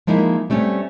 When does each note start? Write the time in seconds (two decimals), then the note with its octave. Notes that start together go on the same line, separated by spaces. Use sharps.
0.07 F3 G#3 A#3 D#4 E4
0.50 G3 A3 C4 C#4